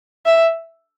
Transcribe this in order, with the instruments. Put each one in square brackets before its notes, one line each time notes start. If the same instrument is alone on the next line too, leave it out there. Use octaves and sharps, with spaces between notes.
[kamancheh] E5